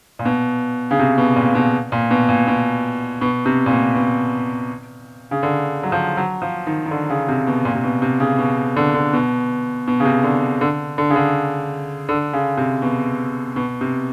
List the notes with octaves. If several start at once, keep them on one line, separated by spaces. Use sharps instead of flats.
A#2
B2
C#3
C3
B2
A#2
B2
A#2
B2
A#2
B2
B2
C3
A#2
B2
B2
C#3
D3
F#3
F3
F#3
F3
D#3
D#3
D3
C#3
C3
B2
A#2
C3
B2
C3
C#3
B2
D3
D3
B2
B2
C#3
C3
D3
D3
D3
C#3
D3
D3
C#3
C3
B2
B2
C3